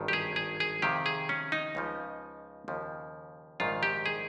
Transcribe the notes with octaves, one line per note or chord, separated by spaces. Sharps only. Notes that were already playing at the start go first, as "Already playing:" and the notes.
Already playing: G#1 G2 D#3
G4
G#4
G#4
G#4
F2 C3 D#3 G4
G#4
C#4
D#4
C#2 C#3 F3
D#2 C#3 F3
A#1 G#2 D#3 F4
G4
G#4